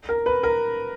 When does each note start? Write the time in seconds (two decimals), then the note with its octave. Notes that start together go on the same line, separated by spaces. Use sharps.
0.09 A#4
0.26 B4
0.43 A#4